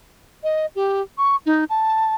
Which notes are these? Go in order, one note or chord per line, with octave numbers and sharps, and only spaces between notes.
D#5
G4
C#6
D#4
A5